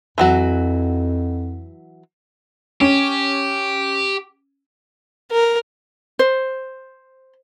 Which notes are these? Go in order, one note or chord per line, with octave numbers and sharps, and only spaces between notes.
F2 E3 F#3 F#4
C#4 G4
A#4
C5